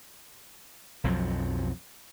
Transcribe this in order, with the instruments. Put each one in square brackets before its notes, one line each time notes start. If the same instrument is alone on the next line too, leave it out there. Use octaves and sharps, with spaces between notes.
[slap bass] B1 F2 F3 F#3